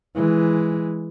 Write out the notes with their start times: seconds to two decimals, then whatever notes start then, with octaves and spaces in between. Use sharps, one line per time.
0.16 E3 G#3